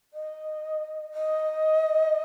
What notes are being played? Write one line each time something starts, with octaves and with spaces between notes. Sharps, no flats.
D#5
D#5